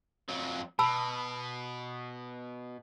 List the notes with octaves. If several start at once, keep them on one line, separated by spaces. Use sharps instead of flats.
F2 F#3
B2 A5 B5 E6